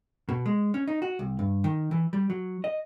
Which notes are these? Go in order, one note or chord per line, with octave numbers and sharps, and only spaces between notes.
B2
G#3
C#4
D#4
F#4
C2
G2
D#3
E3
G3
F#3
D#5